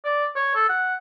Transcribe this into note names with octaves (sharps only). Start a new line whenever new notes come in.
D5
C#5
A4
F#5